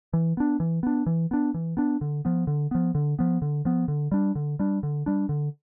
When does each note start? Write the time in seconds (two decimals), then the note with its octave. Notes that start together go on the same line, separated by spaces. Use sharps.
0.13 E3
0.37 B3 D4
0.60 E3
0.83 B3 D4
1.06 E3
1.31 B3 D4
1.54 E3
1.77 B3 D4
2.01 D3
2.25 F3 B3
2.47 D3
2.71 F3 B3
2.95 D3
3.19 F3 B3
3.42 D3
3.65 F3 B3
3.88 D3
4.12 G3 D4
4.35 D3
4.59 G3 D4
4.83 D3
5.06 G3 D4
5.29 D3